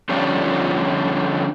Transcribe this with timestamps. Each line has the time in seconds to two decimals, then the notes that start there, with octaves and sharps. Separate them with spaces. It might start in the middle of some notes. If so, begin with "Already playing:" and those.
0.09 D3 F3 G3 C#4 D4 F4